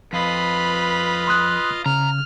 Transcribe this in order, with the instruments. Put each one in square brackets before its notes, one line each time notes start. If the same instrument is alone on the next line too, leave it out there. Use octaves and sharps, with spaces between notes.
[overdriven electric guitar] F2 [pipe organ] F4 D#5 F5 [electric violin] B4 B5
[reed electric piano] C6 D#6 F#6
[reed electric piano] C#3 [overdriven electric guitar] A#5 [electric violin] F6